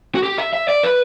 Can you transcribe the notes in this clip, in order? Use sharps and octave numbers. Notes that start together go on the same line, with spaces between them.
F#4
G4
E5
E5
D5
B4